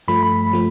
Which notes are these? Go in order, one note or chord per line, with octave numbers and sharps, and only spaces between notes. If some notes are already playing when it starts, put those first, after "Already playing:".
G2 F3 A3 B5
B5
F3 A3